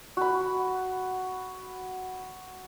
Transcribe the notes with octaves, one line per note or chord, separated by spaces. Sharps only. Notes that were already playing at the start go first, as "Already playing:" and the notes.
F#4 B5